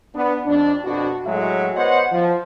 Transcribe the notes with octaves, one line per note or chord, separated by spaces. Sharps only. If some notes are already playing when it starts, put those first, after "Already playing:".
B3 D4
F2 D4
F2 B2 D4 F#4
A2 F#3 G#3 F#4 E5
B3 C5 C#5 D#5 F#5
F3